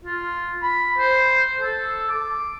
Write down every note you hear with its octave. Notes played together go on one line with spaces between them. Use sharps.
F4
B5
C5
A4
D6